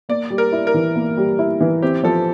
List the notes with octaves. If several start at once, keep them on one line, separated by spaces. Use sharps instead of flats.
A#3 D5
G3
A#4
E4
A#4
E3
A#3
G3
E4
E3
C4 G4
F3 A4